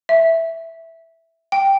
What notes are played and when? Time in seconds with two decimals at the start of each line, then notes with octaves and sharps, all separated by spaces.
0.09 E5
1.52 G5